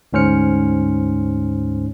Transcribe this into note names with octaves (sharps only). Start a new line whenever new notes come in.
D2 G#2 C#4 C5 F6 C#7